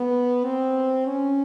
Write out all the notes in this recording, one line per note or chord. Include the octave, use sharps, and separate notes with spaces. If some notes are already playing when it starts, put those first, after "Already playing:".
Already playing: B3
C4
C#4